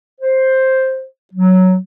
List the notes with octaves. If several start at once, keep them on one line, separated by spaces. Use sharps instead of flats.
C5
F#3